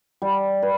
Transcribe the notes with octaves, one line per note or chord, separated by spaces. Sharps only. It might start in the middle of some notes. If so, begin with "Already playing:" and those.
G3
B4